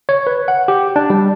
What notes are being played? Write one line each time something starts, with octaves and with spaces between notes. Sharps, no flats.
C#5
B4
F#5
G4
D4
G3